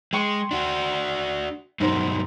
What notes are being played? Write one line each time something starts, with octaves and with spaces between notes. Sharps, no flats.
G#3 G5 C6 C#6
D4 F#4
G2 B2 F#3 D#4 C5